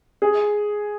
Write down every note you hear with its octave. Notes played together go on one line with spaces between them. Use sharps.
G#4